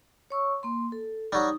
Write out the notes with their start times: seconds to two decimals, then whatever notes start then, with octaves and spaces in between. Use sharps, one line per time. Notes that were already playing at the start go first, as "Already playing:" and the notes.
0.30 C#5 C#6 E6
0.63 A#3 C6
0.92 A4
1.32 F#3 G3 D#4 D#6